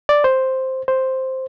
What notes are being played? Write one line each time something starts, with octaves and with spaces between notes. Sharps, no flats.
D5
C5
C5